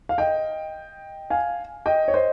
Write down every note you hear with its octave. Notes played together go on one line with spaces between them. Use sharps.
F5
D#5 G5
F5 G#5
D#5 G5
C#5
C5 D#5